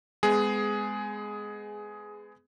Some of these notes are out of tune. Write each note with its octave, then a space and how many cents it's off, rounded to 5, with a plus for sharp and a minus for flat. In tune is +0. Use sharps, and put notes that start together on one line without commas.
G#3 +0 B3 +30 G#4 +10